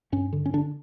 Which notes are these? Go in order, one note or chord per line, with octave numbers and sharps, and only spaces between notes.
G2 C#4
D3
C#4
D3 D4